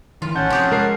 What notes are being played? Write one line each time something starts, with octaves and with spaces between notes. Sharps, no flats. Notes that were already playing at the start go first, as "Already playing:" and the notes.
D#3 E3 F4
A1 C#4 F#5 A5 G6
C3 F3 G4 G#4
G#3 A#4 C7